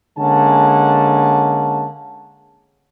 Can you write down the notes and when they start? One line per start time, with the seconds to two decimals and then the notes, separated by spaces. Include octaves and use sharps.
0.18 D3 G#3 A#3 C#4 F#5 A5